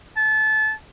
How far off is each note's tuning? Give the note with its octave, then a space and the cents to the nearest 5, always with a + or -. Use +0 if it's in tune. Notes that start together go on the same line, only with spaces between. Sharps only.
A5 -25